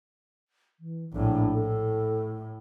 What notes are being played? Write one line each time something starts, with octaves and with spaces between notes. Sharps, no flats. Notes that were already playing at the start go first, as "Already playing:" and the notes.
E3
A#1 A2 D4
A2 A4